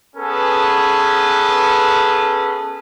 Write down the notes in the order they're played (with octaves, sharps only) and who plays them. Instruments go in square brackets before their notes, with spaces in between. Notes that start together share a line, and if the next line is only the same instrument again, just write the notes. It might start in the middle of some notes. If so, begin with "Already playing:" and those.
[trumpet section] B3 C#4 G#4 A4 B4